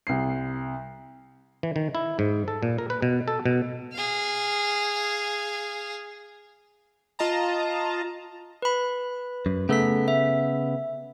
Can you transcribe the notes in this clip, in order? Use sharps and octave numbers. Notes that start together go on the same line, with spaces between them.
C2 C7
E3
D#3
E4
G#2
A4
A#2
A#4
B4
B2
A4
B2
G#4 F5
F4 D#5 A5 A#5
B4 B5
F#2
C#3 A3 B3 A4 B6
E5